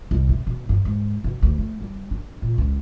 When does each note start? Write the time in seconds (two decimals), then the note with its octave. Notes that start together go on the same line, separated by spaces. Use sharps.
0.11 C2
0.29 C3
0.47 B2
0.69 G2
0.85 G#2
1.24 B2
1.42 D2
1.58 A3
1.81 G3
2.11 D4
2.42 A#2
2.58 C#2